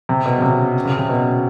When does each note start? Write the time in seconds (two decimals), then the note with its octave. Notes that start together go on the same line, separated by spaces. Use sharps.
0.09 C3
0.26 B2
0.38 C#3
0.42 C3
0.85 C#3
0.98 C3
1.09 B2